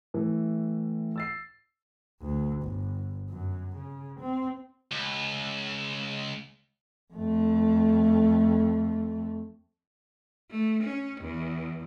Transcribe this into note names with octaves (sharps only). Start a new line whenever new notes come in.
A2 E3
E6 A6 C7
D2
G1
F#2
C#3
C4
C#2
F2 A3
A3
C#4
E2